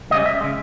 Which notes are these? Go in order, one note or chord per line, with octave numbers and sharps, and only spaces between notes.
C#2 C#3 G3 C#4 D#5
E5
C#3 G#3